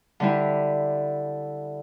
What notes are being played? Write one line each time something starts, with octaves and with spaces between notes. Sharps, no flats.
D3 G3 E4